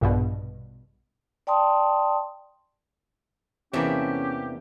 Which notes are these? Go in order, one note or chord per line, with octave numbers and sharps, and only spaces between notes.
A#1 G2 B2
D5 G5 A5 C6 D#6
E2 C3 E3 A#3 C#4 D4 G4 E5